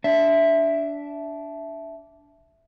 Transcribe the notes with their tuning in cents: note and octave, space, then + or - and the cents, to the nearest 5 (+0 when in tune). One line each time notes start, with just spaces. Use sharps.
D4 -15 E5 +0